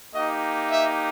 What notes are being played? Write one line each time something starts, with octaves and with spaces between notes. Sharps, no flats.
A#3 D#4 G4 D#5
E5